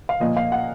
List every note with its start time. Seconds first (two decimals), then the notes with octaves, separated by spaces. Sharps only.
0.09 F5
0.20 A#2 F3 A#3 D#5
0.37 F5
0.52 F#5